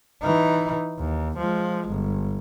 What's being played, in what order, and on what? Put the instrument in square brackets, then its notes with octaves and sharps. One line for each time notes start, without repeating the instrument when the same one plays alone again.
[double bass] E3 D#4
D#2
F3 G#3
G1